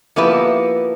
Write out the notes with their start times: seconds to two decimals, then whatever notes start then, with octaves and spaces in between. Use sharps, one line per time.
0.16 F3 A#3 B3 E4 G4 B4